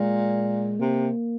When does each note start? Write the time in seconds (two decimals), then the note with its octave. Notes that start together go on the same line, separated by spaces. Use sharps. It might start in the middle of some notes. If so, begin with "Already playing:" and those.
Already playing: A#2 G#3
0.79 C3 A#3